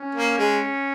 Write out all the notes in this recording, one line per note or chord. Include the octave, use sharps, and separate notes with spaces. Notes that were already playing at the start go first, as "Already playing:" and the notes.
Already playing: C#4
A#3
G#3